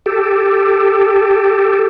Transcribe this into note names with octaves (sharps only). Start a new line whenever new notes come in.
G4 A4